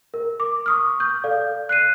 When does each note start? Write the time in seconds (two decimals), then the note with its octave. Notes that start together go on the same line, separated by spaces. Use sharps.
0.14 A#4
0.40 D6
0.66 C#6 D#6 F6
1.00 G6
1.24 A4 D5 F5
1.69 F#6 C7 D#7